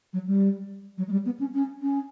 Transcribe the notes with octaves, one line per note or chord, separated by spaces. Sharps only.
F#3
G3
F#3
G#3
G3
B3
C#4
C#4
C#4